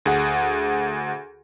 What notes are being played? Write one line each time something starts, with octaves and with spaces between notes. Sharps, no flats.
D2 G#4 F#5